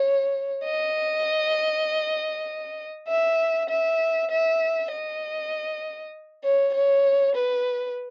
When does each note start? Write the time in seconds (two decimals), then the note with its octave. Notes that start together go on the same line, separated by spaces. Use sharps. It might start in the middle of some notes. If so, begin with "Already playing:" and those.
Already playing: C#5
0.64 D#5
3.08 E5
3.69 E5
4.31 E5
4.92 D#5
6.44 C#5
6.74 C#5
7.35 B4